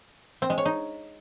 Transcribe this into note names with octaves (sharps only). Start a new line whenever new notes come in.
C4
G#3
C#5
D#4